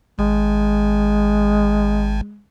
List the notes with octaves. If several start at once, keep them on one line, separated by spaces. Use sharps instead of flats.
G#1 G#3